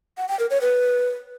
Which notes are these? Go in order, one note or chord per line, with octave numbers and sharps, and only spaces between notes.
F#5
G5
A#4
C#5
B4